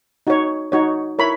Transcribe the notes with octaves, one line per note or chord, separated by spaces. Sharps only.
D#4 F#4 C#5
D#4 F#4 C#5
E4 A#4 C#5 B5